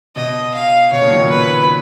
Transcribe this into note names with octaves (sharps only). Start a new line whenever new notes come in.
B2 D#5
F5
B2 C#5
A#2 C#3
D#3 F#3
A#2
B4